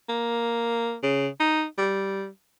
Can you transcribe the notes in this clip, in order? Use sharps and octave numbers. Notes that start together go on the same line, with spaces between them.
A#3
C#3
D#4
G3